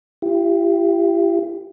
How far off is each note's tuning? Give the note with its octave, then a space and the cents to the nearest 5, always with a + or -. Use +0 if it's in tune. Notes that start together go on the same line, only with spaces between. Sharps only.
E4 +45 G4 +0